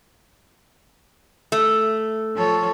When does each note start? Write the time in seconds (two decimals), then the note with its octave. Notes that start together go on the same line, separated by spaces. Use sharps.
1.52 A3
2.36 F3 A4 C#5